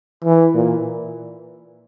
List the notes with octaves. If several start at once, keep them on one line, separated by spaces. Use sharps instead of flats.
E3
A#2